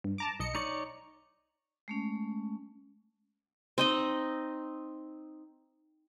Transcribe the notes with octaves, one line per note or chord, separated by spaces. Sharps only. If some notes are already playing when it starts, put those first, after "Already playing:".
G2
A5 A#5 D6
B1 D#5 C#7
D#4 C#5 D5 C#7
G#3 A3 C#4
C4 D#4 D#5